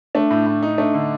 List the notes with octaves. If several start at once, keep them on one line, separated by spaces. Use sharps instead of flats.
A3 D4
A2
A2
D#4
A3 D4
D3